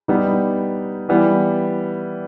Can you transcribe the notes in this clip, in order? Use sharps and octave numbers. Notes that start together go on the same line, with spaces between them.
G3 B3 D#4
E3 G3 B3